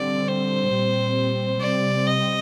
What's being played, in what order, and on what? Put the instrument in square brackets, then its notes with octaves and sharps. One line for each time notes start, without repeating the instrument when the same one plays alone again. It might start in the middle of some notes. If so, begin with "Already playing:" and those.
Already playing: [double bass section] D3 G3 C4 [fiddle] D5
[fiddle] C5
[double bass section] A#2 G3 C4
[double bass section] C3 G3 C4 [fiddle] D5
[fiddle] D#5